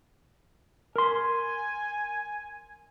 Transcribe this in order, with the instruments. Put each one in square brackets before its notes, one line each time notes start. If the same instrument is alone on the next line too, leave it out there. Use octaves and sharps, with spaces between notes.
[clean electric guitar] A#4 C6 [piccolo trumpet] G#5